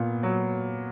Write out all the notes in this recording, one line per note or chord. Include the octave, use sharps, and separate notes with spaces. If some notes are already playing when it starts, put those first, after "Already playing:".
Already playing: A#2 B3
F#3